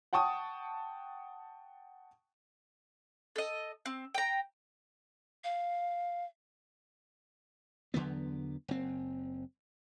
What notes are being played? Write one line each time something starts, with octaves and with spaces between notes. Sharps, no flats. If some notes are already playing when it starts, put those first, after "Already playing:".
F#5 G5 A5 C#6 D#6
A4 D#5
C4
G5 A#5
F5
E2 D3 F#3 B3
F#1 C4